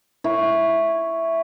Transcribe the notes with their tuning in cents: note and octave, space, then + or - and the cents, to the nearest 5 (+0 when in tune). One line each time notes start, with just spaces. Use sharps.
E4 +0 C#5 +0